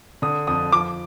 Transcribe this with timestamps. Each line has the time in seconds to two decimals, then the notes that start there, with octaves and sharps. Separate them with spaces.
0.22 D3 D#6
0.47 F2 D#6
0.72 F3 D6